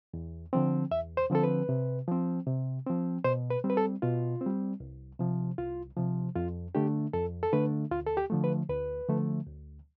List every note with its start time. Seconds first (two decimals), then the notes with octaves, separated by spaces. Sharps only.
0.14 E2
0.53 D3 F3 C4
0.92 E2 E5
1.17 C5
1.30 D3 F3 C4 A4
1.43 B4
1.69 C3
2.07 F3 C4
2.47 C3
2.86 F3 C4
3.24 B2 C5
3.50 B4
3.64 G3 C4
3.70 B4
3.77 A4
4.02 B2 F4
4.41 G3 C4
4.80 C2
5.19 C3 F3
5.58 C2 F4
5.97 C3 F3
6.36 F2 F4
6.75 D3 A3 D4 G4
7.13 F2 A4
7.43 A4
7.53 D3 A3 D4 B4
7.91 D2 F4
8.07 A4
8.17 G4
8.30 D3 F3 A3
8.44 B4
8.69 D2 B4
9.08 D3 F3 A3
9.47 D2